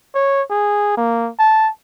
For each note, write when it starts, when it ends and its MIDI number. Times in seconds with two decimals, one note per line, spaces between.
0.15 0.42 73
0.50 0.93 68
0.97 1.30 58
1.39 1.70 81